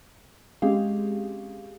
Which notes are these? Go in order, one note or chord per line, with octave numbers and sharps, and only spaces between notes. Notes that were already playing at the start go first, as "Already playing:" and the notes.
G#3 C4 C#4 G4 G#4 F5